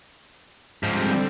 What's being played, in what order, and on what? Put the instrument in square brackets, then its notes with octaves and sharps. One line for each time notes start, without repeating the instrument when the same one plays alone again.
[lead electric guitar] G#2 F3 [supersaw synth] D3 G3 C4